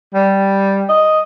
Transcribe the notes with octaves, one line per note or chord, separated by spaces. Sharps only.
G3
D#5